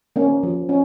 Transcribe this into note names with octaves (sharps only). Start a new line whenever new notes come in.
A#3 C#4
F3
C#4